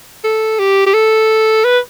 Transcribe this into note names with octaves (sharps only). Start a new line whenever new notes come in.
A4
G4
G4
A4
B4